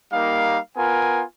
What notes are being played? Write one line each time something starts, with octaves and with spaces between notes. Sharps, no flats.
G3 A#3 D#4 F5
B3 F4 A#4 G#5